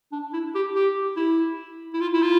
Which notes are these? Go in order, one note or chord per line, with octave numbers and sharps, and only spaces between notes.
D4
E4
G4
G4
E4
E4
F4
E4
F4